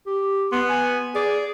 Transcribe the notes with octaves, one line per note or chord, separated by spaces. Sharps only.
G4
B3 C6
G#5
G#4 D5